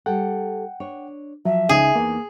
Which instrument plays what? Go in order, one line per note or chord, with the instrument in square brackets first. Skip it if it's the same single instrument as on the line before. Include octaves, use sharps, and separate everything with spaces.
[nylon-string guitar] G3 A4 [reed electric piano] F#5 G5
[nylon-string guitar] D4 C#5
[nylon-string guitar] F3 [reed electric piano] F#3 [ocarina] E5
[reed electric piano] C#2 C#3 D#4 [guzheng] G#4
[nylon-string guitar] E2 D#4 [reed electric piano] A#3